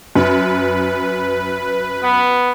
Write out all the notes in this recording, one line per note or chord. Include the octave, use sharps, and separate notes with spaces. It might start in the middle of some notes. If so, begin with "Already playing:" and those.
F#2 B4
B3